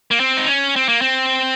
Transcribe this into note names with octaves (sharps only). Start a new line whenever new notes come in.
A#3
C4
D#4
C#4
C4
A#3
C4